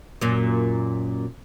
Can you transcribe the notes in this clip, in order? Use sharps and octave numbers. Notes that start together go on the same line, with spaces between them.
F#2 A#2